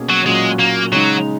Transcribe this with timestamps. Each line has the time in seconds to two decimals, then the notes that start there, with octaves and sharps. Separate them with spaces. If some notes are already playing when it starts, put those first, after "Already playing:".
Already playing: B2 A#3 C#4 G#4
0.10 F#3
0.26 A#2 F#3 G#3 C#4 F#4
0.59 A#3
0.92 C#3 F#3 G#3 D#4